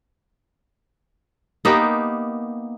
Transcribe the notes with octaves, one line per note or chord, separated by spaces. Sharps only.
A#3 B3 D#4 G4